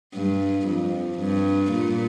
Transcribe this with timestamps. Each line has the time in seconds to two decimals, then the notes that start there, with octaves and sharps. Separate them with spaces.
0.14 G2
0.67 F2
1.20 G2
1.72 A#2